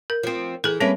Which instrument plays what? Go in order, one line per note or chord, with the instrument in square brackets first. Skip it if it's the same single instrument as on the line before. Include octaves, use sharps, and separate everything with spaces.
[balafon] A#4
[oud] F3 C4
[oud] E3 [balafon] G#4 A4
[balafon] G3 C4 [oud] A#3 C#4 B4